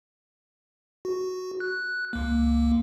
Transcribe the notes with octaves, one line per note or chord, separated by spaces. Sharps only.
F#4
F#6
C#2 A#3